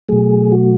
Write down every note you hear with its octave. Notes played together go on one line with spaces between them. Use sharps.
B2 F#3 A3 G#4
F#4